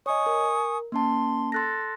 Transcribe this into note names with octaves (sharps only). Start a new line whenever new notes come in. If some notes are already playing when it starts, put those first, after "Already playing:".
C#5 D#5 G#5 C#6 D#6
A#4
A#3 C#4 A5 C6
A4 C6 F#6 A#6